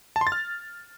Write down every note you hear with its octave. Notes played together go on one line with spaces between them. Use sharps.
A5
C6
A6
F6